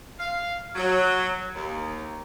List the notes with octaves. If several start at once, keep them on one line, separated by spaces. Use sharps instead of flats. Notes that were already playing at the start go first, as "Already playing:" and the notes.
F5
F#3
D#2